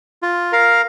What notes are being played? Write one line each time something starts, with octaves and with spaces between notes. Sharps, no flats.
F4
A#4 F5